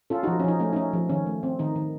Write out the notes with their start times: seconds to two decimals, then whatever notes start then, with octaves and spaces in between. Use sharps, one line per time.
0.10 C#4 F4 A4
0.23 D#4 F#4
0.27 F3
0.40 C#4
0.44 F3 D#4
0.60 A3 C#4
0.73 D#4
0.76 C#4
0.93 F3
1.09 D#3 C#4
1.26 A3
1.43 C4
1.59 D#3 D#4
1.76 D#3